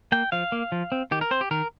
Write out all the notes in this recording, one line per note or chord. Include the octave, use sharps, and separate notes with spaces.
A#3 G5
F3 F5
A#3
F3
C4
D#3 G4
A#4
C4 C5
G4
D#3 A#4